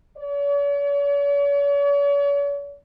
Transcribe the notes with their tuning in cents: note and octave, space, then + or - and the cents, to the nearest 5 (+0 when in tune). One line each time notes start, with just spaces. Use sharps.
C#5 +45